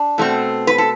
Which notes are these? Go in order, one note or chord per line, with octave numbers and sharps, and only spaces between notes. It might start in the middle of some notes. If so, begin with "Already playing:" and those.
Already playing: D4
B2 A3 C4
B4
A4